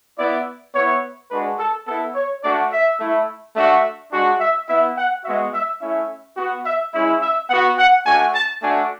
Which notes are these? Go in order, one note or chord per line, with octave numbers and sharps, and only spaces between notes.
B3 E4 D5
B3 E4 C#5
G#3 D4 F#4 B4
A4
B3 E4 A4
C#5
A3 D4 F#4 D5
E5
A3 E4
A3 D4 F#4 E5
G#3 D4 F#4
E5
B3 E4 E5
F#5
G#3 B3 F#4 E5
E5
A3 C#4 E4 E5
B3 F#4
E5
G#3 C#4 E4
E5
B3 F#4 F#5
F#5
A3 D4 F#4 G#5
A5
A3 D4 F#4 G#5